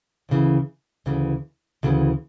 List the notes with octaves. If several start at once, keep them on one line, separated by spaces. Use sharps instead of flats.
D2 C#3 E3
D2 C#3 E3
D2 C#3 E3